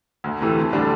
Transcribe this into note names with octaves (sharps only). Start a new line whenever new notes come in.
D2
C3 E3 A3
D2
D3 G3 D4